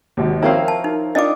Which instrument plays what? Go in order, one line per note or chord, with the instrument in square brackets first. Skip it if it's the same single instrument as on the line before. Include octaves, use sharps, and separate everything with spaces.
[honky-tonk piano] G#1 D#2
[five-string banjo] F3 C4 E4 [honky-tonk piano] A#4 C#5 F5
[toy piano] A5
D#4
[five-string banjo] D4 D#4 F4 [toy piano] D#5 D6